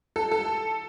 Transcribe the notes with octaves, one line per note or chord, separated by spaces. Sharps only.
A4
A4